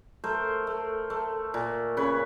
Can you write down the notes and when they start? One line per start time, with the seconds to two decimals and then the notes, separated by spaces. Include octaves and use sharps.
0.24 A3 A#4 C5
0.67 A3
1.10 A3
1.54 A#2
1.97 C#3 B4 C#5